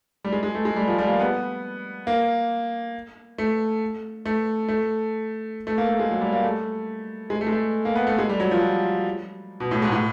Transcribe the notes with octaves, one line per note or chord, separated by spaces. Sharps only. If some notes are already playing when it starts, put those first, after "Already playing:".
G3
G#3
G#3
A3
G#3
G3
F3
G3
A#3
B3
A#3
A3
A3
A3
A3
A#3
A3
G#3
F#3
G3
A#3
A3
G#3
A3
G#3
A3
A#3
B3
A3
G#3
G3
F#3
F3
B2
A2
G#2
A2